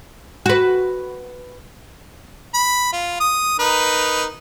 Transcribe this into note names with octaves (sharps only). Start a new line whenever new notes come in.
F#4 B4
B5
F4
D#6
D#4 A#4 B4